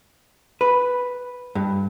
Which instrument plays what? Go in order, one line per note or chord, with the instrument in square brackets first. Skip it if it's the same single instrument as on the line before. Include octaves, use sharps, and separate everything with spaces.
[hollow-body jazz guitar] B4
G2